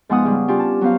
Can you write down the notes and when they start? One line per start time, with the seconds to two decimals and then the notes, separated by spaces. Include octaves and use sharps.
0.09 G#2 F3 G#3 B3 F#5 D#6
0.25 C#3 G3
0.48 G3 C#4 D4 F4 G4
0.59 A5
0.81 F#3 B3 C5 F5